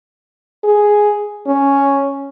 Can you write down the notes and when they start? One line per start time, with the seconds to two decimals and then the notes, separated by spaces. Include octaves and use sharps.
0.64 G#4
1.47 C#4